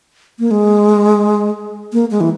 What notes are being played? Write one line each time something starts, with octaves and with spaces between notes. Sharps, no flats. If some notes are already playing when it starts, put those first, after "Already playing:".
A#3
G#3
A#3
G#3
E3